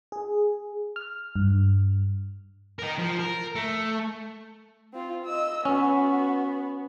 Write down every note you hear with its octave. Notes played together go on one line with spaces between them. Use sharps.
G#4
F6
G2
D#4 A#4
F3
A#4
A3
C4 F4
D#5 E6
B3 C#4 F#4